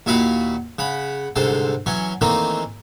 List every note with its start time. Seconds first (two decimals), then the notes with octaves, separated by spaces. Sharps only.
0.06 D#2 A#2 E4 F#4 F5 B5
0.79 C#3 F#5 B5
1.36 C2 G#2 D3 A4 C5
1.86 E3 F#3 C#4
2.21 D#3 E3 A3 A#3 C4 D#4